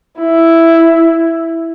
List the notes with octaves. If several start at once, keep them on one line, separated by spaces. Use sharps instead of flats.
E4